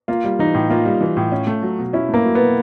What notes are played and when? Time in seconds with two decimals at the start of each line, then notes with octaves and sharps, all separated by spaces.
0.08 A#3 F4
0.24 G3
0.39 E3 D#4
0.54 A2
0.70 A#3 F4
0.85 G3
1.01 E3
1.17 A2
1.32 C#4
1.47 A3
1.62 F#3
1.79 B2
1.93 C#4 E4
2.09 A3 A#3
2.24 F#3
2.35 B2 B3